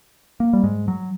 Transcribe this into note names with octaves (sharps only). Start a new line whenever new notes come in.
A#3
G3
G#2 G#3
F#3